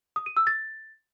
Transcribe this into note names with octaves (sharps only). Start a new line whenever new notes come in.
D#6
D#7
E6
A6